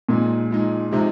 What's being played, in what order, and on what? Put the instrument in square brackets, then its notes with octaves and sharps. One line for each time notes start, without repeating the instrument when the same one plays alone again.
[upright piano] A#2 [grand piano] F3 G#3 D#4
[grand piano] F3 G#3 D#4
[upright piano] C3 [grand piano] F3 G#3 D#4